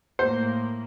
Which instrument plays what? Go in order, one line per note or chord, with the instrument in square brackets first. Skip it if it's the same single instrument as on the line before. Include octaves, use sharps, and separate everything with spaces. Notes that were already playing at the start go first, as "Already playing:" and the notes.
[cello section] A2 A#3 [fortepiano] C5